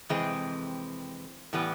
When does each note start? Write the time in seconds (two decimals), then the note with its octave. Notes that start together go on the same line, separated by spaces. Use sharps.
0.09 F2 C3 E3 G#3 C4
1.53 A2 E3 G3 B3